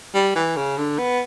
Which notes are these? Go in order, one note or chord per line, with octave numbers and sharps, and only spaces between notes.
G3
E3
C#3
D3
B3